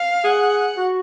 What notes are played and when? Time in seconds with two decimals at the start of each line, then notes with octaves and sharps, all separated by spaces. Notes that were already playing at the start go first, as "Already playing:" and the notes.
Already playing: F5
0.24 G#4 F#5
0.77 F#4